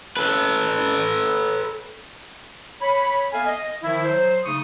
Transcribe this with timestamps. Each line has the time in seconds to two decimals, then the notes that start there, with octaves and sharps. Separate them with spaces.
0.17 A4 B4
2.81 C#5 B5
3.32 B3 A4 E5 F5 G#5
3.46 D#5
3.83 D#3 F3 E4
4.05 F#3 C5
4.45 C#3 A3 D#4 C#6 D#6